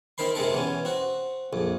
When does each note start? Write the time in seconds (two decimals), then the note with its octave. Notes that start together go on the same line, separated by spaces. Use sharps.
0.18 C4 D#4 A#4 C5 B5 C6
0.35 C3 G#3 C4 A4 A#4
0.52 B2 E3 C#4
0.85 C4 F#4
1.53 A#1 F2